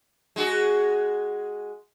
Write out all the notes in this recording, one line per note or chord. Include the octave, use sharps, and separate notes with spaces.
G#3 F#4 G#4